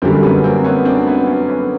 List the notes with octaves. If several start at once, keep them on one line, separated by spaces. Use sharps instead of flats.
F#2 D3 G3 A#3 C4
B3 C#4
A#3 C4
B3 C#4
C4 D4
B3 C#4
B3 C#4
B3 C#4